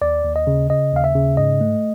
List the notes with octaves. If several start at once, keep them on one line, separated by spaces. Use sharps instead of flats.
D#2 D5
D#2
D#5
C#3
C#3 D#5
D#2 F5
E5
C#3
G#2 D#5
A3